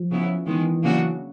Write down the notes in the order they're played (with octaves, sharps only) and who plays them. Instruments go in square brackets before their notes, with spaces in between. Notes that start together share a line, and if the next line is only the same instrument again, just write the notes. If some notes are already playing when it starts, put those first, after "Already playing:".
Already playing: [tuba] F3
[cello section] C#3 F#3 B3 E4
[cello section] D#3 G#3 B3 [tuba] E3
[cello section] C#3 F#3 A#3 D4 F#4